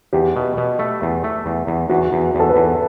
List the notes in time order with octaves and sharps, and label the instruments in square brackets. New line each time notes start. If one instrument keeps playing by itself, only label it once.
[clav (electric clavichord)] E2 [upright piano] G4
[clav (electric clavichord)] B2
B2
A3
E2
A3
E2
E2
[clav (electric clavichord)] E2 [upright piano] F#4
[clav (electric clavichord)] E2
E2
[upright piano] A4
B4
[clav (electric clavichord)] E2